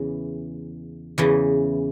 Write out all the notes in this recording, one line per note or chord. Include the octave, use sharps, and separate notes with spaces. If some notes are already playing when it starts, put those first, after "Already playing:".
Already playing: E2 C#3 E3
E2 C#3 E3